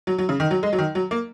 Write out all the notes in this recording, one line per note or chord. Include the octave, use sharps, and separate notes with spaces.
F#3
F#3
C#3
D#3
F#3
G#3
F#3
D#3
F#3
A#3